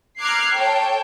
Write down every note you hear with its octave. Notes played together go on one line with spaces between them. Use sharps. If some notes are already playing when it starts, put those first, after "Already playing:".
A#5 D6 F6 F#6 G#6 C7
A4 C#5 G5 A5